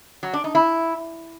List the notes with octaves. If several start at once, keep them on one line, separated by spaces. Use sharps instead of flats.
F#3
D4
D#4
E4